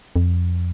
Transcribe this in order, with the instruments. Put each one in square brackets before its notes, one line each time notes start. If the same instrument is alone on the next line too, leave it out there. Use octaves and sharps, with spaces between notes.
[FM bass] F2